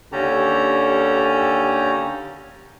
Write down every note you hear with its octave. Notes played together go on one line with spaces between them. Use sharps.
D#2 D3 C#4 G4 A4 A#5